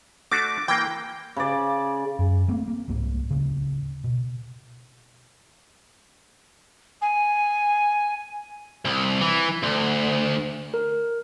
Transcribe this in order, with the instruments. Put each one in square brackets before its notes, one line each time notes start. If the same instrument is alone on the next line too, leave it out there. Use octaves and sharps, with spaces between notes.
[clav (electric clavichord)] A3 D4 F#4 [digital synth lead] D6
[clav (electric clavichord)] E3 A#3 [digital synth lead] G5
[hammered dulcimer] C#3 D5
[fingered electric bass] F#2
A3 A#3 C4
A#3
D1 C2 G#2 A#3
D1 C#3
B2
[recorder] G#5
[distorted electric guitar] C2
E3
D2
[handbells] A#4